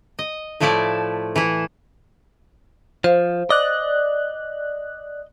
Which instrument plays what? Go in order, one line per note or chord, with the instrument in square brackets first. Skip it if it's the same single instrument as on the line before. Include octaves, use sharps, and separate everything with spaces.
[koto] D#5
A2 F3 A3 E4 D5 A5
E3 E4
[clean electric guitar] F3 [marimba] C5 F5
[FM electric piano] D5 F#6 [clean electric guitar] D#5